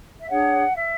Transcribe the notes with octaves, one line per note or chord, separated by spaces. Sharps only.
E5
D4 G#4 C#5 F#5
E5